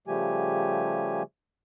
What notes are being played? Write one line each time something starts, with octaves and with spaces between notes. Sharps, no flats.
C#3 F3 G3 A3 G4 G#5